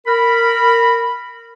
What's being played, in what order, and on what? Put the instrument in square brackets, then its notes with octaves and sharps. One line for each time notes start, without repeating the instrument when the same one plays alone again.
[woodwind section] A#4 B5